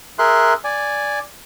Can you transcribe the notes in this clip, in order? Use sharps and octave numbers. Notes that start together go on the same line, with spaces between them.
G#4 A#4 E5 C6 F#6
D5 G#5